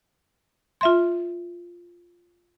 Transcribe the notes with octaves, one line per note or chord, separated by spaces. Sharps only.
F4 E5 C6